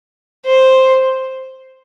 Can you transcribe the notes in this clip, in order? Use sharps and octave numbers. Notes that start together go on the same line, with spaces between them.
C5